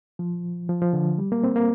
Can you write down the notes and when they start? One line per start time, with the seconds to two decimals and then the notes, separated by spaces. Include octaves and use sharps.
0.19 F3
0.69 F3
0.82 F3
0.93 D3
1.18 G3
1.32 A#3
1.44 C4
1.56 A#3